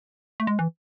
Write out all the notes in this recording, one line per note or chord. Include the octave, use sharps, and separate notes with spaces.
A3
G#3
E3